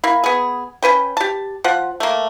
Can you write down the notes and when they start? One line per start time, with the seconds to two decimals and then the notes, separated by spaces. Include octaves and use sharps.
0.04 A#3 E4
0.24 B3 G#4
0.83 C#4 E4 B4 G5
1.17 G4 A5
1.64 F3 F4 F#5
2.00 A3 A#3